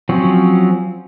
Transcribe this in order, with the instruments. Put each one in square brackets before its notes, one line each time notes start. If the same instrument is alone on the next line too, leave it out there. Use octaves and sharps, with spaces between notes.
[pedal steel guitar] F3 F#3 C4 C#4